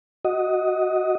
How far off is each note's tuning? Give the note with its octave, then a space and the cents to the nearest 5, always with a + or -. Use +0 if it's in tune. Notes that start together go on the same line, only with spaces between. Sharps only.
F#4 +0 D#5 +10